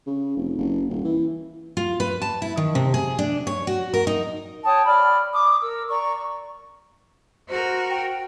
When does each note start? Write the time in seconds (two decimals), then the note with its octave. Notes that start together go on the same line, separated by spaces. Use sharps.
0.07 C#3
0.37 F1
0.58 F#1
0.89 D#1
1.05 E3
1.77 F4
2.00 B4
2.22 A5
2.42 E4
2.57 D#3
2.75 C3
2.94 G#4
3.19 D4
3.47 C#5
3.67 F#4
3.94 A#4
4.07 D#4
4.64 C#5 G5 A5 D#6
4.85 D5 B5 F6
5.33 D6 D#6
5.61 A#4 E6
5.89 D5 A#5 C#6
6.17 C#6
7.48 F#4 A#4 C5
7.90 G5